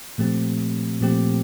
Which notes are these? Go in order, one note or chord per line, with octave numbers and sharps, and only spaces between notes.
A#2 F3 A3 C4 G4
A#2 F3 A3 C4 G4